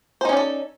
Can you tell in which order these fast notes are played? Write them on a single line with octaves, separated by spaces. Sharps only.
C5 D#4 C#4 D5 A4